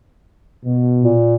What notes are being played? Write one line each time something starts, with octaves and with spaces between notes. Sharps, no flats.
B2
A#2